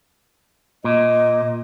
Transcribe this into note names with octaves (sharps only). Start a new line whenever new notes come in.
A#2 D#5